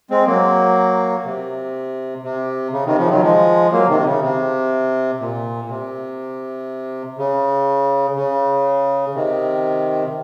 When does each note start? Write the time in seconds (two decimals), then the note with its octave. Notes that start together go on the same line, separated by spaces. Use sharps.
0.10 G#3 C4
0.27 F#3 A#3
1.25 C3
2.24 C3
2.73 C#3
2.86 C3 D#3
2.98 C#3 F3
3.10 D#3 F#3
3.23 F3 G#3
3.71 F#3 A#3
3.89 C3 D#3
4.00 D#3
4.05 C#3
4.22 C3
5.20 A#2
5.65 A#2
5.69 C3
7.18 C#3
8.16 C#3
9.15 C3 D#3